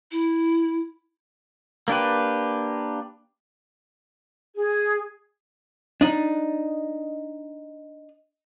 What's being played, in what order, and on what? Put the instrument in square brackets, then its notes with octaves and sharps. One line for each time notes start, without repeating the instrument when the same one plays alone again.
[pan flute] E4
[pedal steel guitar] A#3 D4 G4 B4
[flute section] G#4
[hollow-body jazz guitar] D4 D#4